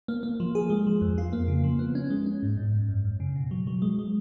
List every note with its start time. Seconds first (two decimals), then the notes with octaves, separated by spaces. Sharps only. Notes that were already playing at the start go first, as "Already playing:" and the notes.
0.08 A#3
0.23 A#3
0.40 F3
0.55 G#4
0.70 G#3
0.87 F3
1.02 F2
1.18 F4
1.33 A#3
1.48 C#3
1.64 F3
1.79 B3
1.95 C#4
2.10 G#3
2.26 C#4
2.43 G#2
2.57 G#2
2.73 G#2
2.89 F#2
3.05 F#2
3.20 C#3
3.36 B2
3.51 F#3
3.67 F#3
3.82 G#3
3.99 G#3